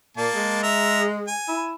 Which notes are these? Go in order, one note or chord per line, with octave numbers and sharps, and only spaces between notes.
A#2 A#3 A5
G#3
E5 A#5
G#5
E4